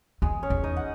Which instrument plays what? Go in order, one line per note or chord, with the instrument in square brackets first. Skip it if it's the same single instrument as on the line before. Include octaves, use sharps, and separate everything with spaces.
[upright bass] E2 [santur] G#3 G#4
[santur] C#4 C#5
[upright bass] E2
[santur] D#4 D#5
F#5